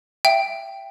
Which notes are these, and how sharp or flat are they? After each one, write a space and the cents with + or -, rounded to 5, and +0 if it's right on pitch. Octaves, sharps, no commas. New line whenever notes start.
E5 +25 G5 +0